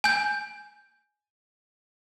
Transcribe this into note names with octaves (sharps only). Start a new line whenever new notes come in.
G#5 G6